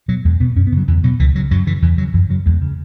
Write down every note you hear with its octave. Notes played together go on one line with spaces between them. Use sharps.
B2 F#3
E2 G#3
B2 B3
F#2 C#4
B3
C#3
F#3
E2 E3
B2 F#3
C#2 E3
C#3 F#3
F#2 F#3
C#3 E3
E2 E3
C#3 F#3
F#2 E3
C#3 F#3
E2 G#3
C#3